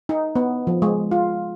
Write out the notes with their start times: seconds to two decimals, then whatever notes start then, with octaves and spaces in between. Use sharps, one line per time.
0.09 D#4
0.36 B3
0.67 F3
0.82 G#3
1.11 F4